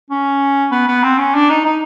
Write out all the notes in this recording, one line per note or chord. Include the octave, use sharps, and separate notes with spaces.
C#4
B3
B3
C4
C#4
D4
D#4
D#4